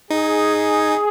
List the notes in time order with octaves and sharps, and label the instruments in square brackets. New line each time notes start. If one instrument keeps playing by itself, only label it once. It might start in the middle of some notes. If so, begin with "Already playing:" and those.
[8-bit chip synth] D#4 [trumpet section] G#4